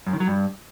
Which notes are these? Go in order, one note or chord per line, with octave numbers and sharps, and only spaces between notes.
F#2
D#3
F#3
G2